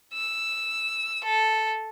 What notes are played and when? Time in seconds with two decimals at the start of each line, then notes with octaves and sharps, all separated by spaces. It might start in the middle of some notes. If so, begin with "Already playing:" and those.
0.13 E6
1.24 A4